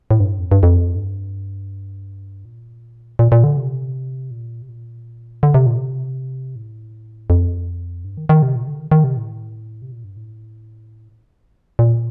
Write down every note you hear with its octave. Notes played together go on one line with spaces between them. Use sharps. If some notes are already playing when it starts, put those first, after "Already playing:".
A2
G2
F2
G2
F2
G2
A#2
A#2
A#2
D3
C3
A#2
C3
A#2
D3
C3
A#2
C3
A2
F2
G2
D#3
D#3
C3
A#2
C3
D3
D#3
D#3
C3
A2
C3
A#2
G2
A2
A#2